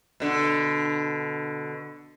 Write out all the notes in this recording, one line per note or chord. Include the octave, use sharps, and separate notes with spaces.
B2 D3